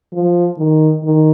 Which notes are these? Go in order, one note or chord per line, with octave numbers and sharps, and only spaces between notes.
F3
D#3
D#3